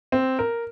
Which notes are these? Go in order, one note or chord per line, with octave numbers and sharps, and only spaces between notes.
C4
A#4